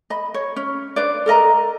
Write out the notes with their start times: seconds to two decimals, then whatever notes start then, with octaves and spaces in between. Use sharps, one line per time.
0.10 D#5 B5
0.34 C#5
0.56 C#4
0.96 D4 B4 C5 D5
1.26 A4 A#4 D#5 A#5